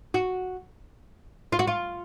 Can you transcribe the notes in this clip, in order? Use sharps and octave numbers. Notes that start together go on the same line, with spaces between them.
F#4
F4
F#4
F4